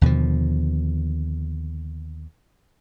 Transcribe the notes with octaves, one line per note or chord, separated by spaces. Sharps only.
D#2 B2 D3 F3